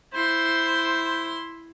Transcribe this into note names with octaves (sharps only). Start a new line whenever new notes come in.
E4 C5 C6